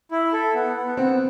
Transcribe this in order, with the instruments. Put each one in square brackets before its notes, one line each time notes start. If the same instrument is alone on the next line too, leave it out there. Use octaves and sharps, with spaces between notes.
[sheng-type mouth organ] E4
A4
B3
B3
[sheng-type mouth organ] B3 [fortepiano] C4